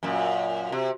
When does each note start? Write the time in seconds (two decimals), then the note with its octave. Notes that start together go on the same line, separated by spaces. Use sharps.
0.03 F#2 A#2
0.72 C3